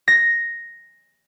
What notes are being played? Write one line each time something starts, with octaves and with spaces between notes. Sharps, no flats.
A#6